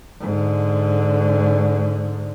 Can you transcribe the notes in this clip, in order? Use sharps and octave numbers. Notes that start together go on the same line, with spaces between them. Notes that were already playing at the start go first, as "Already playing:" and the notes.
G#2 D3